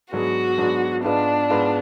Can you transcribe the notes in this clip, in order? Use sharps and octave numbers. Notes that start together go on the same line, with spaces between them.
G#2 F#3 B3 D4 F#4 G#4
G#2 F#3 B3 D4 G#4
G#2 G#3 B3 D4 F4 B4
G#2 G#3 B3 F4 B4